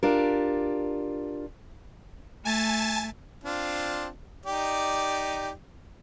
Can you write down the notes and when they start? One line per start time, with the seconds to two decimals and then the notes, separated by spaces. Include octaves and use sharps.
0.03 D4 F4 G4 A#4
2.45 A3 G#5 A5 A6
3.44 C4 D4 F4
4.46 D#4 G4 D5